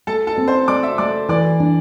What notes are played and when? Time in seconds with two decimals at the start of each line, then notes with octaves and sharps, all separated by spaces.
0.07 A3 A4 A5
0.27 A4 A5
0.37 C4
0.47 C5 C6
0.68 A3 D5 D6
0.83 E5 E6
0.98 A3 D5 D6
1.29 E3 D5 D6
1.60 D4